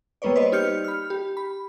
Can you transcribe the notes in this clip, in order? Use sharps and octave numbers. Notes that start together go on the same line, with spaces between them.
G3 A#3 B3 B4 C#5 D5
B4 C5 D5 D#5
D#4 G4 F6 G6 C#7
B5 F6
G4
B5